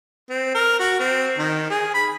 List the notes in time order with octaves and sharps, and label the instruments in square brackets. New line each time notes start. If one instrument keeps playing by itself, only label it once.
[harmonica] C4
A#4
F#4
C4
D#3
G#4
B5